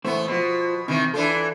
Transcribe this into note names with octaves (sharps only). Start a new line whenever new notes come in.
E2 A2 A3 B3 C5
B2 F3 C5
C3 D#3 E3
E3 D4 F4 A4 B4